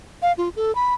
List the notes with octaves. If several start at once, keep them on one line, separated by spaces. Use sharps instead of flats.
F5
F4
A4
B5